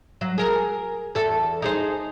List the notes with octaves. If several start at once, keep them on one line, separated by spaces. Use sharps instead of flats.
F#3
G#4 A#4
E2 A4
D#4 G#4 C5